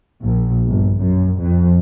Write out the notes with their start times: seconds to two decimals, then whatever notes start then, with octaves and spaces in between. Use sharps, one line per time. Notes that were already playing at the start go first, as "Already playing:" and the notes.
0.22 A#1
0.68 G1
1.02 F#2
1.41 F2